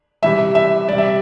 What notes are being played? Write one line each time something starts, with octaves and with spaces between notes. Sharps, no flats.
C3 E3 G3 E5
E5
C3 G3 D5
E5